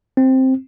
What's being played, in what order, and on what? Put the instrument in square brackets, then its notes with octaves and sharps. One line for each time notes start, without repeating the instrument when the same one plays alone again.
[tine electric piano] C4